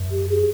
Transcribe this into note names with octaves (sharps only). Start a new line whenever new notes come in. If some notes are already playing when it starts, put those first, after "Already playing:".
Already playing: F#2
G4
G#4